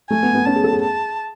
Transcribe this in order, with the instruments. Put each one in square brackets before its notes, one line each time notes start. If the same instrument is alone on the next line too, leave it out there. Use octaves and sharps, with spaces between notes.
[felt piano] A3 [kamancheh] G#5
[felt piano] B3
B3
[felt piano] C#4 [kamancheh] A5
[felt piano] G#4
A4
G#4
[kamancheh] A5